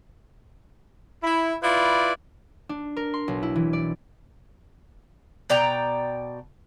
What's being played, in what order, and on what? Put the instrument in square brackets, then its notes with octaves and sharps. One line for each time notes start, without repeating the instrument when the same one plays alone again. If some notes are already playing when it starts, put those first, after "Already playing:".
[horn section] E4
E4 F4 B4 D5
[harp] D4
A#4
C6
B1
E4
E3
D5
[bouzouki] B2 D5 G5 A#5